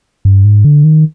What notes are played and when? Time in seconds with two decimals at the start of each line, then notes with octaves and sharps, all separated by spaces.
0.25 G2
0.44 G#2
0.65 D3
0.84 D#3